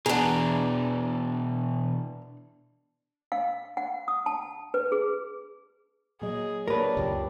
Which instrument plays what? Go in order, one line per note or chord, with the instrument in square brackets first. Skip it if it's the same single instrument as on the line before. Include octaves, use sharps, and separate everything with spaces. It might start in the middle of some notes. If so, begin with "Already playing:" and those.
[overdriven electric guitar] B2 E3 [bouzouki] D4 A#5 [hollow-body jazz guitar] G#4 F#5
[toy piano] F5
F#5
D#6
A5
B4
G#4
[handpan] A#2 F#3 D#5 [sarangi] G#4
[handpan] A#3 G4 C#5 [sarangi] D4 [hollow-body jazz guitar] A#4 B4
[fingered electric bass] C#2 F#2 A#2 [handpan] G4